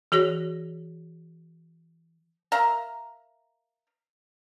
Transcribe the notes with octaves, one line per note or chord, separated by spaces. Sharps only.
E3 F#4 G#4 C#5 A#6
A#4 E5 F5 A#5